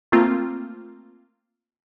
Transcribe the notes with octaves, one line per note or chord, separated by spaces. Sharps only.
A3 A#3 C4 F4